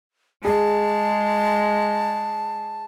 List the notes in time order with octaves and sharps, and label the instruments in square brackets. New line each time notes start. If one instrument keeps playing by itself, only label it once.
[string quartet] G#3 [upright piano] G#4 [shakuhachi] A5